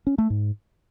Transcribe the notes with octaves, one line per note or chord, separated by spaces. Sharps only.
C#4
A3
G#2